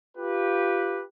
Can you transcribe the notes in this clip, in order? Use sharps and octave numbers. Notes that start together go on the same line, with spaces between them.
F4 G4 B4